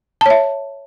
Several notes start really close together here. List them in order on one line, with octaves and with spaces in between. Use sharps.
A5 C#5 E5